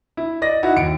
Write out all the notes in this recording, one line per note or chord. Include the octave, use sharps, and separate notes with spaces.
E4
D5 D#5 A#6
D#4 E4 F#4
D#2 C#7 D7